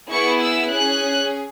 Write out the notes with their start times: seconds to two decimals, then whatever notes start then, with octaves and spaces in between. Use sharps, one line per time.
0.10 B3 E4 G#4 C#6
0.41 E6
0.71 C#4 G#4 F#6